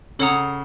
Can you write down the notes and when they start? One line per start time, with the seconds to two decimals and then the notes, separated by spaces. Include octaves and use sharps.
0.19 C#3 A4 C#5 F#5 A#5 D#6